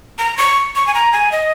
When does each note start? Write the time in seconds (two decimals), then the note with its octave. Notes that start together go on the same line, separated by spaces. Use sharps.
0.18 A#5
0.37 C#6
0.75 C#6
0.87 G#5
0.95 A#5
1.13 G#5
1.32 D#5